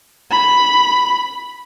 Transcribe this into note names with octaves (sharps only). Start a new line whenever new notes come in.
B5